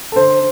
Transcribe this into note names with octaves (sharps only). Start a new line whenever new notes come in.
A4
D3 C5